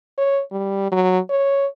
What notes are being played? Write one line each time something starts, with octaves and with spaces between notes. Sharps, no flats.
C#5
G3
F#3
C#5